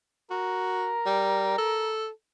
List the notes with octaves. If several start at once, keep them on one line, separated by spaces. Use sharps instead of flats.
F#4 A#4
G3
A4